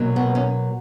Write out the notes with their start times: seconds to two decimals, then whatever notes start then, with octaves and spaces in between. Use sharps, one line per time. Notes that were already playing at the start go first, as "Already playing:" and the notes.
Already playing: B2 F#3 A#3
0.16 B3
0.35 C#4